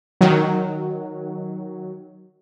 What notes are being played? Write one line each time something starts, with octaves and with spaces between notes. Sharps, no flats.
D#3 F#3